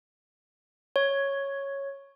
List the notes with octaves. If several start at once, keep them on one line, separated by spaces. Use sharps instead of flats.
C#5